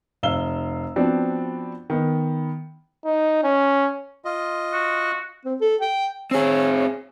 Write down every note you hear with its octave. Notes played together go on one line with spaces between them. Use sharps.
F1 F5 E6 G7
F3 B3 C4 D4 F#4
D#3 B3
D#4
C#4
F4 D#5
F#4
C4
A4
G5
C4 G#4 C#5